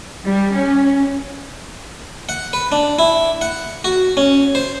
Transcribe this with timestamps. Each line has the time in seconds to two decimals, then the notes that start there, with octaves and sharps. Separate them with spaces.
0.25 G3
0.55 C#4
2.29 F#5
2.53 B4
2.72 D4
2.99 E4
3.41 F#5
3.84 F#4
4.17 C#4
4.55 C5